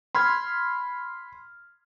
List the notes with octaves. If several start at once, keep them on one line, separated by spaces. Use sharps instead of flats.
B5 C6 F6 G#6